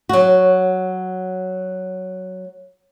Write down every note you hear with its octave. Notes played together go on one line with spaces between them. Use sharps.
F#3 F#4